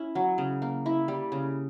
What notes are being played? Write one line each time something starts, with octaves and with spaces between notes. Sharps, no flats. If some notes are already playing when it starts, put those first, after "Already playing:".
Already playing: C#4 E4
F#3
C#3
A#3
E4
G3
C#3